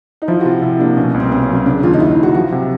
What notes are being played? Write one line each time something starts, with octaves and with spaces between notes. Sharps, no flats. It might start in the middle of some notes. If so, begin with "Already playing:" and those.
D#4
F3 E4
F#4
C3 F4
C3 E4
A#3 D4
B2 C#4
C2
C4
B3 C#4
C#4
F#3
C#4
C#3 D4
D#2 F4
D#4
D#2 E4
D#4
F#3
F#4
F3 F#4
C3